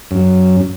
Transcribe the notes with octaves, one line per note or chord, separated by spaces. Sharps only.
F#2